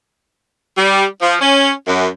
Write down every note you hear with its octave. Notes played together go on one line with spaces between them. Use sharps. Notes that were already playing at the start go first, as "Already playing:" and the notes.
G3
F3
C#4
F#2